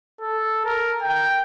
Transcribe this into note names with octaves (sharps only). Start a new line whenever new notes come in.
A4
A#4
G5